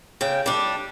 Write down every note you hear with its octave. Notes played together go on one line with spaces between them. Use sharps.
C#3 G5
G3 D4